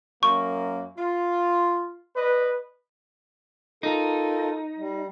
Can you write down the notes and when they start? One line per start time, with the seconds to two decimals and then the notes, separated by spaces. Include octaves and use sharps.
0.23 F#2 A#3 C#6
0.98 F4
2.16 B4 D5 D#5
3.83 D#4 F4 A4 A#4
4.78 G3